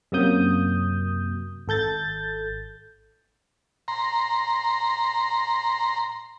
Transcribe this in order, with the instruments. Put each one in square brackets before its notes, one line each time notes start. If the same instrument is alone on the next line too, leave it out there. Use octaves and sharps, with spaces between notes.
[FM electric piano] F#2 C3 F#3 A#3 D#6 G6
G#1 A4 G6 A6
[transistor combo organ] A#5 C6